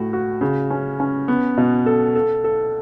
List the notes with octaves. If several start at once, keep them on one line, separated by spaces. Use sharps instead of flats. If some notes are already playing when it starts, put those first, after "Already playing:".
Already playing: A2 F#4
F#4
C#3
C#4
C#4
B3
B2
A4
A4
A4